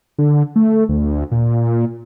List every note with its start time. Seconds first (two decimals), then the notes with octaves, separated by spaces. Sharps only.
0.18 D3
0.56 A3
0.89 D2
1.32 A#2